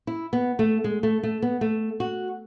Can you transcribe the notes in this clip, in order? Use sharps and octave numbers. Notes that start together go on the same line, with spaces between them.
E4
B3
A3
G#3
A3
A3
B3
A3
F#4